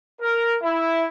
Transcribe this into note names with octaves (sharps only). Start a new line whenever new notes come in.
A#4
E4